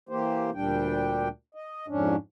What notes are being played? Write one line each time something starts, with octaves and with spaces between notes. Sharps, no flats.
E3 A#3 G4 C5
D2 A#2 G3 D4 G5
D#5
F2 G#2 C#4 D4